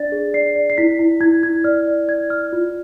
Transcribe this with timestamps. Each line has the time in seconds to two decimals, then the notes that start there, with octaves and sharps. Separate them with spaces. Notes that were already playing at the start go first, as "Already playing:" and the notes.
Already playing: D4 D5 A6
0.12 G#4
0.34 D5 C7
0.55 D5
0.70 C7
0.78 E4 B6
0.99 E4
1.21 E4 G#6
1.43 E4 G#6
1.64 D5 F6
1.87 D5
2.08 D5 G#6
2.30 D5 F6
2.53 F4